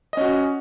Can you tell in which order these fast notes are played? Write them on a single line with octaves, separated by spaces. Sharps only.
D#5 C#4 F#4